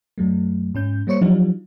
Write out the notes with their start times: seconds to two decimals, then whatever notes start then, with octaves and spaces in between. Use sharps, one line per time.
0.18 F#2 F#3 A3
0.74 G#2 C#4 G6
1.07 G3 A#3 C5 C#5 C#7
1.21 F3 F#3 D4 D#4 F4 G4